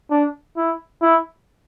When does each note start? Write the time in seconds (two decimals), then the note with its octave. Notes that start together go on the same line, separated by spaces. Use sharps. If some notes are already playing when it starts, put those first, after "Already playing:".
0.11 D4
0.57 E4
1.02 E4